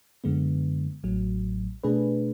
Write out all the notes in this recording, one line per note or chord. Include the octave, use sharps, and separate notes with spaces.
F#2 D3 G#3 B3
A1 A2 F#3
B2 A3 D4 G#4 B4